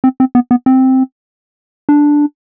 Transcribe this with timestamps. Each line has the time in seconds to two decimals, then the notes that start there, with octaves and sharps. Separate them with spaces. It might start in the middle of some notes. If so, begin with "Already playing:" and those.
0.04 C4
0.20 C4
0.35 B3
0.51 B3
0.66 C4
1.89 D4